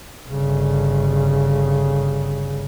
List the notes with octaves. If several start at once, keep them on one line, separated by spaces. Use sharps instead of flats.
G1 C#3